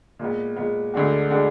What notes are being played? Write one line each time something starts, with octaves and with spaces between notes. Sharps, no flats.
A#2 G#3 B3
A#2 G#3 B3
D2 D3 G#3 D4 F#4
D3 G#3 D4 F#4